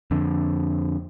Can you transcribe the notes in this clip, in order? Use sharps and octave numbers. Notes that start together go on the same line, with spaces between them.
F2 D3